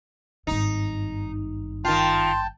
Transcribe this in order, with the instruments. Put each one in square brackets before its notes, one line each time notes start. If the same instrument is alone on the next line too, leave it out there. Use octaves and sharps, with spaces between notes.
[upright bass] G#1 G2 [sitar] D#4
[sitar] D#3 F4 [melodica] G5 A5 [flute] C6